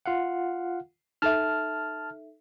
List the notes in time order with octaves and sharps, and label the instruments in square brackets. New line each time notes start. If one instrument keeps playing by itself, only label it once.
[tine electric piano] F4 F5 F#5
[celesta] D#4 A4 E5 [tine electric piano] A5 F6